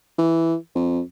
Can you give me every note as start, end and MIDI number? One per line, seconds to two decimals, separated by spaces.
0.18 0.56 52
0.75 1.01 41